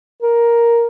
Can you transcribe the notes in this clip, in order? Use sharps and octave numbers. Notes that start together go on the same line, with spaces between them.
A#4